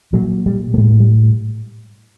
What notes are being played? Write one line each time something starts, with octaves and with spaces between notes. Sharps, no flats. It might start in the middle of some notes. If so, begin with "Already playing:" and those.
A#2 F#3
G3
A3
A2 G#3
G3